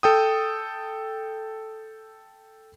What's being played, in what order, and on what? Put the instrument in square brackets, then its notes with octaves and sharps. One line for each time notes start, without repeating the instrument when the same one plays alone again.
[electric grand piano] A4 G5 D#6